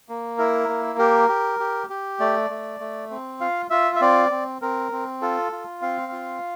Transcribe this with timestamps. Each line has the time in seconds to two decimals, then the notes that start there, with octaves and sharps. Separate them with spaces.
0.09 A#3
0.38 E4 A#4
0.68 A#3
0.98 G4 A#4
1.29 G4
1.60 G4
1.90 G4
2.20 A3 D5
2.50 A3
2.80 A3
3.10 C4
3.41 F4 F5
3.70 F4 E5
3.96 E5
4.01 C4 D5
4.31 C4
4.62 C4 A#4
4.92 C4
5.21 F4 A4
5.52 F4
5.82 C4 F5
6.12 F4